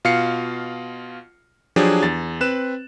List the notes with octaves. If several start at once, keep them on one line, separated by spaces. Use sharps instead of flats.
B2 F4 F5 F6 C7 C#7
F3 F#3 D4 G4 G#4
E2 A6
C4 B4 F#6 E7